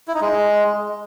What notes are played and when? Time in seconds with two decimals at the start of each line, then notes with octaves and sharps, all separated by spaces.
0.08 E4
0.14 D#4
0.21 G#3